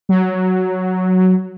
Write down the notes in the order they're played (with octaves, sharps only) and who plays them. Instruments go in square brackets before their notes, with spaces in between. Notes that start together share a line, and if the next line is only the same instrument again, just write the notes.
[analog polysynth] F#3